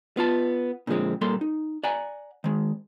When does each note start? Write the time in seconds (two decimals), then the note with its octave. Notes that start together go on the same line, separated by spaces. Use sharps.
0.17 B3 F4 A5
0.87 A#2 D3 F3 G#3 C4
1.21 A#2 G3 A#3 A4 C6
1.41 D#4
1.84 D5 F#5 G#5 A#5
2.44 D#3 G#3